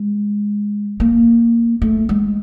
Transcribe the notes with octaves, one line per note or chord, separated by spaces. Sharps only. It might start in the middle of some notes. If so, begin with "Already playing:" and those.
Already playing: G#3
A#3
A3
G#3